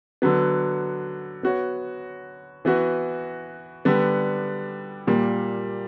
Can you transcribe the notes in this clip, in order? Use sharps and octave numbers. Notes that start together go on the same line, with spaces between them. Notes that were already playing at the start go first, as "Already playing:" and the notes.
D3 F#3 B3
B3 F#4 C#5
E3 B3 F#4
D3 G3 B3
A#2 G3 A#3